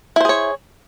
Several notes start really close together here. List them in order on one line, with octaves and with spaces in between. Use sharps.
E4 C5 G#4 C#5